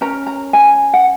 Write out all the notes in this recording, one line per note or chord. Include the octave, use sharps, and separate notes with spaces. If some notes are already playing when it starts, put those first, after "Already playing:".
C#4 A#4 A#5
A#5
G#5
F#5